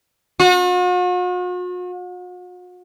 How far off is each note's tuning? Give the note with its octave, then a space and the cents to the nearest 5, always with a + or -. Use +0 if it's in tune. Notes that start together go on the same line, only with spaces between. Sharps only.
F#4 -45